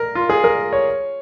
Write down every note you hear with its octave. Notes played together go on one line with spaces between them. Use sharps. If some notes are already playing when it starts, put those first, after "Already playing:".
Already playing: A#4
F4
G#4
A#4
C#5